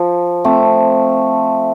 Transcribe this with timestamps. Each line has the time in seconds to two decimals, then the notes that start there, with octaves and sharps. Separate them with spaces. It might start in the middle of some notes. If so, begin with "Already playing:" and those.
Already playing: F3
0.44 A3 C4